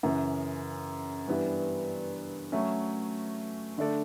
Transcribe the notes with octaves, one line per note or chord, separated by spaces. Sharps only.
F#2 C#3 E3
G2 E3 G3 B3
F#3 A3 C#4
D3 A3 D4 A4 D5